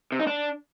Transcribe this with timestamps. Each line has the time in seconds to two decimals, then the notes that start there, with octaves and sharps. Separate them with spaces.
0.12 C3
0.20 D#4
0.27 D4